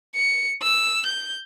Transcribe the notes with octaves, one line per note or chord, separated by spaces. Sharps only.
C#7
E6
G6